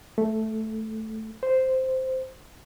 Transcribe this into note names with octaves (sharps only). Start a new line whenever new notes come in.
A3
C5